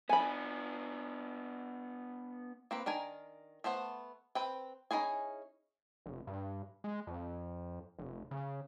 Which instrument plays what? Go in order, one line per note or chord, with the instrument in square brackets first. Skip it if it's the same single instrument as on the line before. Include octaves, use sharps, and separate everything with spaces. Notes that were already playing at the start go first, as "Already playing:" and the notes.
[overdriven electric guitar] B3 D4 [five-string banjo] G#5 B5
[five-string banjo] A#3 C4 B4
D#3 D4 A#4 G#5
A3 B3 C5 F#5
C4 B4 G5
C#4 D#4 E4 G#4 G#5
[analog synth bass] F1
G2
G#3
F2
F1
C#3